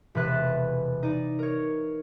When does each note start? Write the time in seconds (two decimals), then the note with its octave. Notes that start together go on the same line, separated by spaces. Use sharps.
0.15 E1 C3 B4 E5 F#6 A6
1.03 D#4 D5
1.39 A#4 C#5